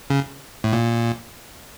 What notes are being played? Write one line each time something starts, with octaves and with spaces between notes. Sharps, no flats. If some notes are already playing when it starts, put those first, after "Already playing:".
C#3
A2
A#2